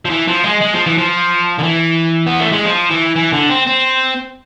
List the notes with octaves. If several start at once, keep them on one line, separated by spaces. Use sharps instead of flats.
F3
E3
F3
G#3
G#3
F3
E3
F3
D3
E3
B3
A3
G#3
F3
E3
E3
D3
C4
C4